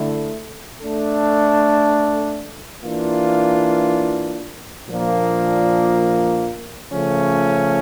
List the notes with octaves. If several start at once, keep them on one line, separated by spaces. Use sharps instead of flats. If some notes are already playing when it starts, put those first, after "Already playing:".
Already playing: D3 A3 E4 A4
A3 D4 A4
E3 A#3 D4 F4
A#2 F3 A#3 D4
C#3 F3 A3 C#4